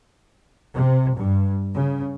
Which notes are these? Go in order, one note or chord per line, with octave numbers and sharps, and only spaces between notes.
C3
G2
C#3